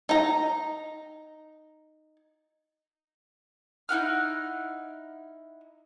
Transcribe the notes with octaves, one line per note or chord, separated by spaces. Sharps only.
D#4 A#5
D#4 E4 F#5 F6